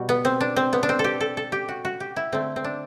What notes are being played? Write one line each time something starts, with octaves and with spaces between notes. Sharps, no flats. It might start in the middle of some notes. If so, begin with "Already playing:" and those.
Already playing: B2 G3 F#4
B3
C4
D4
C4
B3
D4
C4
A4
G4
A4
A4
G4
F#4
F#4
G4
E4
D3 A3 C4
C4
D4